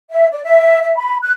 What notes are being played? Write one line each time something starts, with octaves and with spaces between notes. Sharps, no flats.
E5
D5
E5
E5
B5
F#6